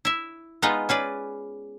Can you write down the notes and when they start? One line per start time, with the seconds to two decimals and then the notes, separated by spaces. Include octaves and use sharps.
0.05 E4 E5
0.62 G#3 B3 D#4 F4 B4 D#5
0.89 C#4 G#4 B4 D5